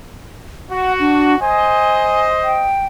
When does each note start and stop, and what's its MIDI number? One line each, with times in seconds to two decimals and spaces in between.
0.71 1.35 66
0.71 0.93 78
1.00 1.38 62
1.40 2.69 72
1.40 2.69 75
1.40 2.23 80
2.44 2.86 79